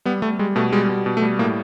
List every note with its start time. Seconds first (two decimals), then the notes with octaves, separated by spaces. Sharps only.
0.05 G3 B3
0.22 G3 A3
0.39 G3 G#3
0.56 B2 A3
0.72 G3 G#3
0.89 B2
1.06 B2
1.17 A3
1.22 G3
1.39 A2 A#3